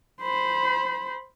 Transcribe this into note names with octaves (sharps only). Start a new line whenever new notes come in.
C5 B5